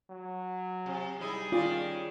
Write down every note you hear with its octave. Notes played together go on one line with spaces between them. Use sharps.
F#3
C3
G3 D#4 E4 G#4
D#3 C#4 F4 D5